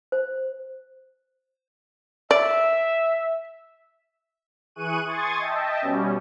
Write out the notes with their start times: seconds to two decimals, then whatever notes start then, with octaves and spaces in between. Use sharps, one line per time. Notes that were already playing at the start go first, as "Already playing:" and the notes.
0.12 C5
2.31 D5 E5
4.75 E3 G#4 C#6 F#6 D#7
5.08 G#5 C6 C#6 D#6 G#6 A6
5.39 D#5 E5 G5 A5
5.82 B2 G3 C#4